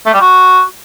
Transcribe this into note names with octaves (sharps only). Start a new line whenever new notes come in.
A3
G3
F#4